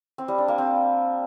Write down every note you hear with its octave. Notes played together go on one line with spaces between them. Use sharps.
C4
G3
D4
A#3
C4